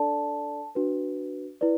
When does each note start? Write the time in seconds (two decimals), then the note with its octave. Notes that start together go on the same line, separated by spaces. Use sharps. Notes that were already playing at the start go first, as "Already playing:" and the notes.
Already playing: D4 A4 D5 A5
0.75 D4 F#4 B4
1.61 E4 B4 D5